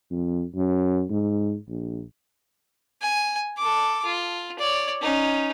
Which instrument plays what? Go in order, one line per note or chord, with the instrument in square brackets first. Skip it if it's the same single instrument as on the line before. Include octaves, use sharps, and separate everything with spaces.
[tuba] F2
F#2
G#2
A#1
[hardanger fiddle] G#5
A4 D6
F4
C#5 D5
C#4 D#4